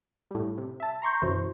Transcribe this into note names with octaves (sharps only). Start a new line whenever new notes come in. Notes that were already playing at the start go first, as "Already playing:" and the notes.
A2 G3
C3
E5 A5
A#5 C6 C#6 G6
F#2 B2 E3 C5